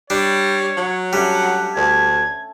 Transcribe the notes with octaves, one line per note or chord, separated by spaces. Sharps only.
G3 D4 C#5
F#3
G3 A3 C#4 D4 F#5
D2 A5 G#6